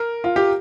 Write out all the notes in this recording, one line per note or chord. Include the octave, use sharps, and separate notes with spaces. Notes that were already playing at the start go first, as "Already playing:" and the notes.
Already playing: A#4
F4
G4